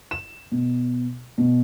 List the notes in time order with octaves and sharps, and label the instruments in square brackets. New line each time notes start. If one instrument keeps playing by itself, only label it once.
[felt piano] E7
B2
B2